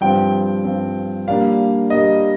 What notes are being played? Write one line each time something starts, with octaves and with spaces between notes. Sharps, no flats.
G2 F3 C4 G5
G2 F3 C4
A#2 G3 A#3 D4 F5
A#2 G3 A#3 D4 D#5